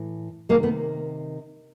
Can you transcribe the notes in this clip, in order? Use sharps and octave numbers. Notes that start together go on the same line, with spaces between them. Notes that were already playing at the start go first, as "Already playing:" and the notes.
Already playing: A2 E3
C3 D#3 G#3 A#3
A3 B3